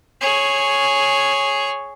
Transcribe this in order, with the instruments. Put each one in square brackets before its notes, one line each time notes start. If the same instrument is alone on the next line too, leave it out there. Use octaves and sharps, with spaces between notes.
[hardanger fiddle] G#4 C#5